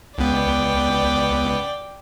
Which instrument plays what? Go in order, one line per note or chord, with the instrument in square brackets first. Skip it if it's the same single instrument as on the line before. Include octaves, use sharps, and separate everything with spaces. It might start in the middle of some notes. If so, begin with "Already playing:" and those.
[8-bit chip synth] C#2 B3 [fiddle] D5 G5